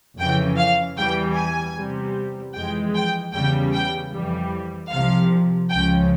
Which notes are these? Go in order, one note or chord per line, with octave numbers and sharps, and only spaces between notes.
F2 C#3 E3 G5
F5
E2 E3 G3 G5
G#5
E2 C3 G3
F2 E3 G#3 G5
G5
E2 C#3 G3 G5
G5
F2 E3 G3
C2 C3 F3 F5
C#2 C#3 F3 G5